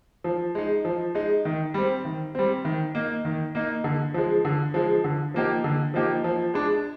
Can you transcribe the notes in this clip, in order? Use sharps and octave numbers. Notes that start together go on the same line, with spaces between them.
F3
G#3 D#4
F3
G#3 D#4
D#3
G3 C4
D#3
G3 C4
D#3
A#3 D#4
D#3
A#3 D#4
D3
F3 G#3
D3
F3 G#3
D3
F3 A#3 D#4 G4
D3
F3 A#3 D#4 G4
F3
G#3 D4